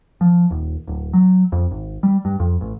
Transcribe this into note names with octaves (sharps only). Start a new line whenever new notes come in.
F3
D#1
D1
F#3
F2
G#1
G3
G2
F2
A1